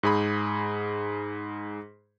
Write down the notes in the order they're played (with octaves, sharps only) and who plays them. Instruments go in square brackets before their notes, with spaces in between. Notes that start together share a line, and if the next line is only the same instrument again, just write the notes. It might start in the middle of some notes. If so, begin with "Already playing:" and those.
[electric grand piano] G#2 G#4 B5